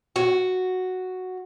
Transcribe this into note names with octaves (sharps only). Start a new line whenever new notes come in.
F#4